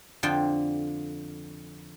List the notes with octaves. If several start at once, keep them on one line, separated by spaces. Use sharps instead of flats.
F2 D3 F3 F4 G5